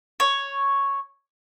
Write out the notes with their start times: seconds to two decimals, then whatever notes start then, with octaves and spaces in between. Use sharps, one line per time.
0.20 C#5